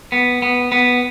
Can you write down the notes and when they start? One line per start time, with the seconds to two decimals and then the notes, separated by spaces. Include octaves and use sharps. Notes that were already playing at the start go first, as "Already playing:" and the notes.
0.12 B3
0.42 B3
0.72 B3